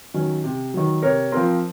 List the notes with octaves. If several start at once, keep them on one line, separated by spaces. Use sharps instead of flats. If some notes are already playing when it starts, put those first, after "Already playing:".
D#3 F#3 C#4
C3
D#3 F#3
C3 A#4 C#5
F3 C4 A#4